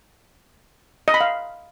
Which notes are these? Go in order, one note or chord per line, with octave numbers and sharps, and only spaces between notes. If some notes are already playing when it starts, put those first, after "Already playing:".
D#5
B5
F5